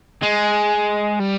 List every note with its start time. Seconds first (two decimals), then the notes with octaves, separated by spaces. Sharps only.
0.23 G#3
1.20 G3